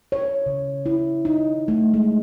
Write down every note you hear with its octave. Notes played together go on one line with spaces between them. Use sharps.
C#5
C#3
E4
D#4
A3
G#3